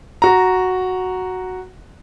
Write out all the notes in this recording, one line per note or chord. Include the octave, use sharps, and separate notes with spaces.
F#4 A#5